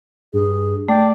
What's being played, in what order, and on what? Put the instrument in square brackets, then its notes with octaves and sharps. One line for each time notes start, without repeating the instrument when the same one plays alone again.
[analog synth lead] G2 [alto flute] G#4
[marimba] A3 [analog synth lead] D5 [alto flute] G5